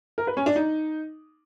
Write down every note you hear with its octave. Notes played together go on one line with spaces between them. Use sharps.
A#4
B4
C#4
D4
D#4